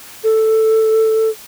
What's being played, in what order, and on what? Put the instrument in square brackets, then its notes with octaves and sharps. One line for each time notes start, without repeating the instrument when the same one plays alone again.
[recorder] A4